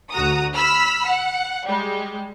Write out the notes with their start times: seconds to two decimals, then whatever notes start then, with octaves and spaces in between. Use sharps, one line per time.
0.12 D2 F#4 A#5 D#6
0.55 B5 E6 F6 B6
1.07 F#5
1.67 G3 G#3